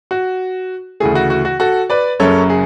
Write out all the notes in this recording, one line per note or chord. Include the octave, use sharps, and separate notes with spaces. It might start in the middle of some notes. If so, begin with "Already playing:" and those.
F#4
D2 C#3 E3 A3 G#4
F#4
F#4
F#4
F#4 A4
B4 D5
F#1 F#2 C#3 F#3 C#4 A4 C#5
G#4